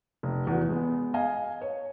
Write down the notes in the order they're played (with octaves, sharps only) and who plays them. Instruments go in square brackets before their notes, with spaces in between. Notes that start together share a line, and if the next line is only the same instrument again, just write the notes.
[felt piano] F1
E2 F#4
G#3 B3
D#5 F5 G#5
C#5